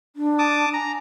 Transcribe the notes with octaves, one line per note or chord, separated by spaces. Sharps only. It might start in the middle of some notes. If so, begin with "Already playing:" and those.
D4
A5 D6 D#6
G#5 A#5